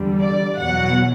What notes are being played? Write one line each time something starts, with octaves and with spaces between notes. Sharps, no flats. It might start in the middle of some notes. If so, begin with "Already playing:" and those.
Already playing: E2 D3 G3
D5
E2 B2 F#3 F#5